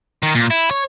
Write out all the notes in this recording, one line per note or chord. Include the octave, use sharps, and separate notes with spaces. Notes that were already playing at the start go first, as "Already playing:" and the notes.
D#3
A#2
E4
C#5